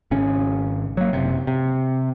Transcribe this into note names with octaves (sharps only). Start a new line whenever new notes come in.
G#1 C#3 C#4
F#3 A#3
F#1 C3
C3